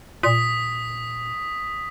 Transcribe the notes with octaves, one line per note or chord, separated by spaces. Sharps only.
A#2 D#6 B6